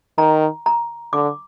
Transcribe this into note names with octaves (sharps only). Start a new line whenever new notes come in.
D#3 A#5
A#5
D3 D6